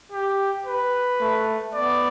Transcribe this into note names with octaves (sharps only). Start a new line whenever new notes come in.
G4
B4
A3
B3 D5